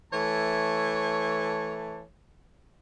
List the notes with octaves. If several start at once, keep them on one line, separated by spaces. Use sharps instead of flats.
E3 A3 C#5 A5